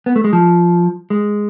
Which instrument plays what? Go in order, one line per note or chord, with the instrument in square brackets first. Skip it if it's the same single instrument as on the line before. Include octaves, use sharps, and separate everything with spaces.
[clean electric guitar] B3
A3
G#3
F3
G#3